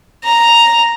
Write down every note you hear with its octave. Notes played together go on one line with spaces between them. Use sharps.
A#5